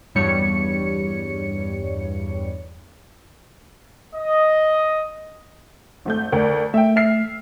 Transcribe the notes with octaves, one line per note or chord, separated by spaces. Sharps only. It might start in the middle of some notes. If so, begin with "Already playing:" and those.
E2 G2 G3 C#5 C#7
D#5
G#1 A3 G6
D2 A#4 D5
A3 E5 G5
E5 F6 C7